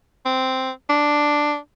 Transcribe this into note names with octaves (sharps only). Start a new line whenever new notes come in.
C4
D4